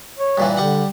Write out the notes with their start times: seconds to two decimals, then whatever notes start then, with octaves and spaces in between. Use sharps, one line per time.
0.19 C#5
0.38 G2 A#2 E3
0.57 D3 G3 F#5